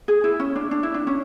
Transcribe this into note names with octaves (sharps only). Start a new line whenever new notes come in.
G#4
E4
C#4
D4
D4
E4
D4
C#4